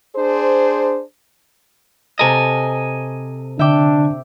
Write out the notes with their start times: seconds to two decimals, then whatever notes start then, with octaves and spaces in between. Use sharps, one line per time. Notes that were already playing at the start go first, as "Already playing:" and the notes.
0.16 D4 G#4 C5
2.19 C3 A4 D#5 G#5 A#5
3.59 D3 D4 E5 G5 D6